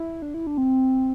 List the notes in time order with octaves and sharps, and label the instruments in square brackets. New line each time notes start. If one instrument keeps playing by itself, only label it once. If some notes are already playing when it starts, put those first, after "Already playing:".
Already playing: [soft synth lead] E4
D4
E4
D4
C4